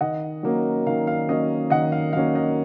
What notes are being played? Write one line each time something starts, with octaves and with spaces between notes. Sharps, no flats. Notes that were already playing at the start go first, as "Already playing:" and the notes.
D#3 D#5 F#5
F#3 A#3 C#4
D#3 F5
F5
F#3 A#3 C#4 D#5
D#3 D#5 F#5
F5
F#3 A#3 C#4 F5
D#5